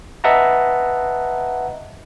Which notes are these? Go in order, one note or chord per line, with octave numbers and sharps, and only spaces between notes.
B4 D#5 E5 F#5 A5 A#5